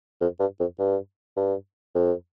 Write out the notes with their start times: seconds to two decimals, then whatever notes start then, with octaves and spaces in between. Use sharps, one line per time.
0.21 F2
0.40 G2
0.60 F2
0.79 G2
1.37 G2
1.95 F2